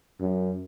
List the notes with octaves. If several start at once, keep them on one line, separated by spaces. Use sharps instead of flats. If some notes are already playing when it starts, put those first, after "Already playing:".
F#2